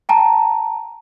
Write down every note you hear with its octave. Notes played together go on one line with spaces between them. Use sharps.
G5 A5 A#5